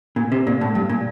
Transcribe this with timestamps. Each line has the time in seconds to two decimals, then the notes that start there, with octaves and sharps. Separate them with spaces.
0.16 A#2
0.32 C3
0.47 A#2
0.61 A2
0.75 G2
0.89 A#2